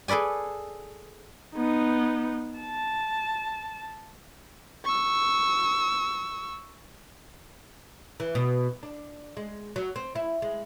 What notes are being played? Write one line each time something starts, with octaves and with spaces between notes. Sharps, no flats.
G#4 A4 B4 D5 G#5
B3 D#4
A5
C#6 E6
E3
B2
D4
G#3
F#3
C4
E4
G#3